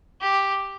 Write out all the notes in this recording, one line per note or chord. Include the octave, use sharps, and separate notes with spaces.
G4